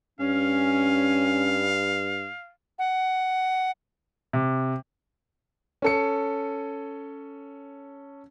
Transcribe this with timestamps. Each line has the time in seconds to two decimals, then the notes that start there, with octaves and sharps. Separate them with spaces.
0.20 G2 C#4 F5
2.79 F#5
4.33 C3
5.82 C#4 A4 C#7